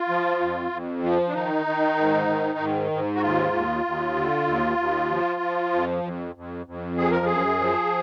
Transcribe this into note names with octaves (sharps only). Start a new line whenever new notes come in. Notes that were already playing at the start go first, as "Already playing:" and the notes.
Already playing: F4
F3
F2
F2
F3
D4
D#3 D#4
D#3
G#2
D#3
G#2
G#2
F#4
D#2 F4
D#2
D#2
D3
D#2
D#2
F3
F3
F2
F2
F2
F2
F3 G#4
A#4
F#2 G#4
F3